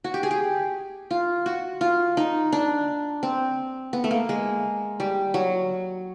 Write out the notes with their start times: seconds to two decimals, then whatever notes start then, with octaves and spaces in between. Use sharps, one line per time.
0.04 F#4
0.14 G4
0.23 G#4
0.31 G4
1.11 F4
1.46 F#4
1.81 F4
2.17 D#4
2.53 D4
3.23 C4
3.93 B3
4.04 A3
4.11 A#3
4.29 G#3
5.00 G3
5.34 F#3